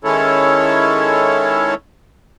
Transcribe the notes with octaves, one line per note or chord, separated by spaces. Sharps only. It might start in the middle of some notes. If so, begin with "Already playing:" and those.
D#3 G#3 C#4 E4 A4 C#5